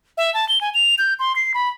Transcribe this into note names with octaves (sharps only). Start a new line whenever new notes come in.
E5
A5
G7
G#5
F7
G6
C6
C7
B5